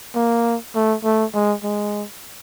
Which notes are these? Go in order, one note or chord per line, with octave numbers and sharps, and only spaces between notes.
A#3
A3
A3
G#3
G#3